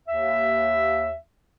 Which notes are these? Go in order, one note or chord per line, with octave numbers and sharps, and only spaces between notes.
D#2 E5